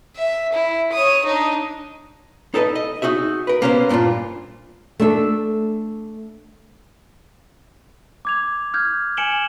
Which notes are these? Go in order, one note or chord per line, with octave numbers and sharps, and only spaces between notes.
E5
E4
C#5 D#6
D4 D#4
D#4 A4 B4 C#5 D#5
D#5
D#4 F#4 G#4 E5
A#4 B4
A#3 B3 C#4 A#4 C5
G2 A#2 C#4 D4 F4
A3 D4 A4
D6 G#6 F7
F6 G6 G#6
G#5 C#7 D7 E7 F#7 G7